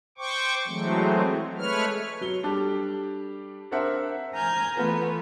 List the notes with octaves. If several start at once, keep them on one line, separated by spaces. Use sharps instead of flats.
C5 G5 C#6 D6
E3 F#3 G#3 A3 C4
G#3 A3 B4 C#5 F6
F#3 G7
G3 D4 G4 A4
C4 D4 A#4 C5 E5 F#5
G#5 A#5 F6 G6 G#6
E3 A3 B3 F4